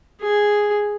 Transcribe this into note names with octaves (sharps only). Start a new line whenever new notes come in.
G#4